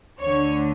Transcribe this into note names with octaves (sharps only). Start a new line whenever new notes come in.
D2 D3 C#5